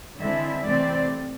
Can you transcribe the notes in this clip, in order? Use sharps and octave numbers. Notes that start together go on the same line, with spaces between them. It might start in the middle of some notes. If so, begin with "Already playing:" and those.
D3 G#3 C4 E4 E5
C3 E3 A3 C4 D5